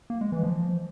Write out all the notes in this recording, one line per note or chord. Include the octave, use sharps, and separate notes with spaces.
A#3
G#3
E3
F3